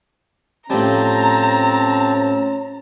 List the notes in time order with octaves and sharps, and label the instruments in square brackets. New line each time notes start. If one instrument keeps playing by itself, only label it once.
[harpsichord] A2 F3 G3 [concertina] C4 A5 [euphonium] C#4 [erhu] A#5